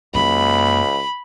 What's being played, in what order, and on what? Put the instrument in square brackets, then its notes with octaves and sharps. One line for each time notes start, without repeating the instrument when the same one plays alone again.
[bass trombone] C#2 [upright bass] F#2 A#3 [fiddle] B5